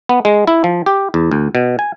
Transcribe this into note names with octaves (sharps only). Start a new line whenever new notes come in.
B3
G#3
E4
F3
G4
E2
D2
B2
G#5